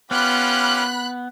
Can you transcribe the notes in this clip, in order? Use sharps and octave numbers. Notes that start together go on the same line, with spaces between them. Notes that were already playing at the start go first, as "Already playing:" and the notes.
B3 C#4 F4 G4 B5 F#6